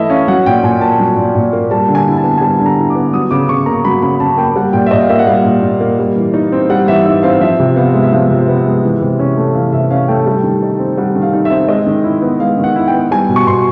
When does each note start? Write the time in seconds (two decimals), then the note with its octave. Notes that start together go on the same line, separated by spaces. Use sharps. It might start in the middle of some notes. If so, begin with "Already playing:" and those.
Already playing: E3 A3 E4 D#5 E5
0.10 C#4 F5
0.28 F#3 F#5
0.46 A#2 G5
0.63 A#2 G#5
0.81 A#3 A5
0.99 F#3
1.17 A#2
1.35 A#2
1.53 A#3
1.71 G3 A5
1.88 D3
1.95 G#5
2.07 E4
2.18 A5
2.24 B3
2.38 G#5
2.41 G3 A5
2.60 D3
2.66 A#5
2.78 E4
2.90 B3 D6
3.13 F#3 D#6
3.31 C#3 D6
3.49 C#3 C#6
3.66 A#3 A#5
3.85 F#3 B5
4.02 C#3 B5
4.20 C#3 A5
4.37 A#3 G5
4.56 G3 F#5
4.73 A#2 G5
4.86 E5
4.91 A#2 D#5
5.02 F5
5.09 A#3 E5
5.19 F#5
5.27 G3 F5
5.44 A#2
5.63 A#2
5.80 A#3
5.99 G3
6.16 E3
6.34 D#4
6.52 C4
6.70 G3 F#5
6.87 E3 E5
7.05 D#4 E5
7.23 C4 F5
7.41 F3 E5
7.59 C3
7.76 B3 F5
7.94 G#3
8.03 E5
8.12 F3 F5
8.30 C3
8.48 B3
8.66 G#3
8.83 E3
9.01 C3
9.19 C#4
9.37 A3
9.55 E3 F5
9.73 C3 E5
9.90 C#4 F5
10.08 A3 G5
10.26 G3
10.43 D#3
10.62 D#4
10.79 C4
10.97 G3 F#5
11.15 D#3
11.22 F5
11.33 D#4
11.45 E5
11.51 C4
11.68 G#3 D#5
11.87 D#3
12.04 E4
12.22 B3
12.40 G#3 F5
12.58 D#3
12.64 F#5
12.76 E4
12.88 G5
12.94 B3
13.11 G3 G#5
13.29 B2
13.36 C#6
13.47 B2 C6